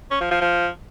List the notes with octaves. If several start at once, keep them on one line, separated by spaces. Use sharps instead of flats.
C#4
F3
F3
F3